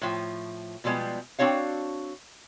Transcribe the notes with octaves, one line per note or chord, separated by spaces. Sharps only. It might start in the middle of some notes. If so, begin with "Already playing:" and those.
A2 F3
B2 F3 G3 G#3 B3
C4 D4 F#4 C#5 F5